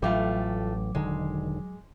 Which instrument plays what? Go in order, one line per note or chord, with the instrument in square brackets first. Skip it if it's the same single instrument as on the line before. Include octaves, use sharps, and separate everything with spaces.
[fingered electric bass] A1 [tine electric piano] F#3 D6 [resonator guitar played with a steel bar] G3 A3 F4
[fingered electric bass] E1 D3 D#3 [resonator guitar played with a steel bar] G#3